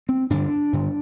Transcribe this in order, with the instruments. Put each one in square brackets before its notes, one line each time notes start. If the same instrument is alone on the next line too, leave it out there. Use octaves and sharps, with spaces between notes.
[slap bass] C4
G2 D3 D4
G2 D3